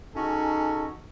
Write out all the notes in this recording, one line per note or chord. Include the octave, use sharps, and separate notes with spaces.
C#4 D#4 F#4 G#4 A4